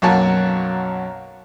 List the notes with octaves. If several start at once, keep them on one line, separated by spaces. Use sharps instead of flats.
B1 F#2 A#3 F#4 C#5 A5